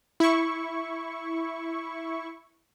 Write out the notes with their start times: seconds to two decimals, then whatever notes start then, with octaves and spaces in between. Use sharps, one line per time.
0.20 E4 C#6